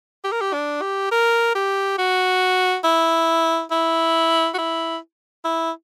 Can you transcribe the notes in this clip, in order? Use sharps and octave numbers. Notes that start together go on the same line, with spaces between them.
G4
A#4
G4
D4
G4
A#4
G4
F#4
E4
E4
F#4
E4
E4